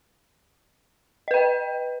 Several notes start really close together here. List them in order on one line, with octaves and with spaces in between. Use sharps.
D#5 B4 G5